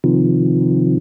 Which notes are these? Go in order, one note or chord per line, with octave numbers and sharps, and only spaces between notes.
C3 D#3 F3